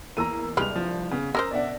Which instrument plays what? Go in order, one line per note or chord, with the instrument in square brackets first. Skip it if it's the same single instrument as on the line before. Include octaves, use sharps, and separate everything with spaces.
[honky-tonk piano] E2 A#3 E6 [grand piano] A#5 D#7
[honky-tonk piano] C2 G2 [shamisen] G#3 G4 B4 [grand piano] F6 F7
[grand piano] F3
[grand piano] C#3 [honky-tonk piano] B3
[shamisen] C#4 A#4 C5 [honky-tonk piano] A#5 [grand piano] D#6 E6 A#6
[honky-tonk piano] B2 D4 [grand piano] D5 E5 F#5